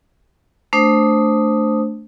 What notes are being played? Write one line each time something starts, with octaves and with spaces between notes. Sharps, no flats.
A3 D4 C5 D#6